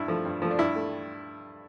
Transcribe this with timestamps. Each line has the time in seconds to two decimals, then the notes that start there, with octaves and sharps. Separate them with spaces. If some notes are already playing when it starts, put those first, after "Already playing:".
Already playing: G2 E4
0.08 F3 A3
0.25 G2
0.42 F3 A3
0.51 D4
0.58 G2 E4
0.75 A3